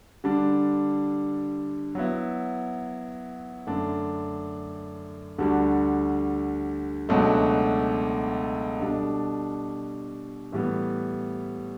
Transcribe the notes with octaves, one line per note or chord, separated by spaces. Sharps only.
D3 G3 D4
F#3 B3 E4
F#2 D3 A3 D4
D2 D3 G3 D4 F#4
C#2 B2 F#3 A3 D4
B2 G3 D4 A4
A2 E3 G3 B3